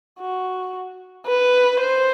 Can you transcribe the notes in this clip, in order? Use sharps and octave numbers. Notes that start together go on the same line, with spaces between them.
F#4
B4
C5